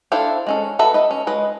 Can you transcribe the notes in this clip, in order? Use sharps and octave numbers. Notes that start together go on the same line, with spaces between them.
D4 E4 A4 C5 F5
G#3 C#4 A4
F#4 A4 B4 E5
B4 D#5
C#4
G#3 B4 D#5